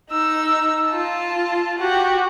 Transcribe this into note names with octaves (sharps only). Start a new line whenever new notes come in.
D#4 E6
F4 A5
F#4 G4